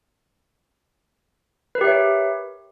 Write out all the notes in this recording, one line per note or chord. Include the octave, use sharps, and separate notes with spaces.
G4 A#4 B4 C#5 E5